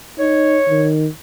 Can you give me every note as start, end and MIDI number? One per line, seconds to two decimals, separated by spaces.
0.19 0.59 63
0.19 0.86 73
0.69 1.08 51